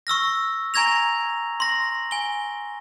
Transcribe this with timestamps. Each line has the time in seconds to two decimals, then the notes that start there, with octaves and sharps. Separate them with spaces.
0.07 C#6 E6 F6 A#6
0.74 G#5 A#5 C#6 G#6 A#6 F7
1.60 C6 A#6
2.11 G#5 G7